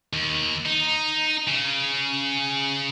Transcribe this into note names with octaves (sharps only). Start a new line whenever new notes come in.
D#2
D#4
C#3